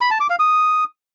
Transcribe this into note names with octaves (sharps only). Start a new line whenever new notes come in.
B5
A5
D6
F5
D#6